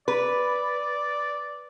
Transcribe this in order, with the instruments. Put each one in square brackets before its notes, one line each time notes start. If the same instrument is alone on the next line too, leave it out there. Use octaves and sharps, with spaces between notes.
[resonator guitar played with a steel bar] B4 [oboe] D5